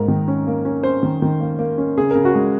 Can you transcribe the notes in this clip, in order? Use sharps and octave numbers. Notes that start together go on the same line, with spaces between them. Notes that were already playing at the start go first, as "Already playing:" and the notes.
Already playing: G#2 A#3 A#4
D#3
C#4
A#3
C#4
C#4 C5
D#3
D#3
A#3
A#3
C#4
C#3 G#4
C#3 A#4
F#4
G#3